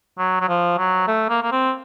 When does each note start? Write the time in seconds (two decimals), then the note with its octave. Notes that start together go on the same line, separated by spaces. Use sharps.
0.19 F#3
0.41 F#3
0.48 F3
0.78 F#3
1.07 A3
1.29 A#3
1.42 A#3
1.52 C4